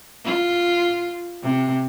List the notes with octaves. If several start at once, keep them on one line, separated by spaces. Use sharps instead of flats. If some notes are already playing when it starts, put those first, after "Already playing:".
F4
C3